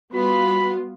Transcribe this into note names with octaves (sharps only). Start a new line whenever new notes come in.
G3 B3 F4 F#4 B5